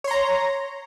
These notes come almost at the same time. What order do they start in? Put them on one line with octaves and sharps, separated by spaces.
C#5 C6 A#5